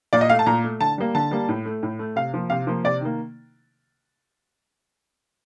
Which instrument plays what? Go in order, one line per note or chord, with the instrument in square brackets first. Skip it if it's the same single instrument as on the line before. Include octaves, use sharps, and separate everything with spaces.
[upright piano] A#2 D5
D#5
A3 F5
A5
A#2 A#5
A3
D3 A5
G3 A#3
D3 A5
G3 A#3
A2
A3
A2
A3
C3 F5
F3 A#3
C3 F5
F3 A#3
C3 D5
D#3 A#3